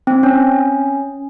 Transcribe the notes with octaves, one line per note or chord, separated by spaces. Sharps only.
C4
C#4